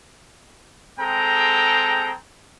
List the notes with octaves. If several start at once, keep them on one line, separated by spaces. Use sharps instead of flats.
G#3 C4 G#4 A4 G5 A#5